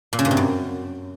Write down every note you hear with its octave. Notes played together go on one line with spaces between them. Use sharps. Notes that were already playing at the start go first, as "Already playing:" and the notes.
A#2
C#3
G2
C3
F#2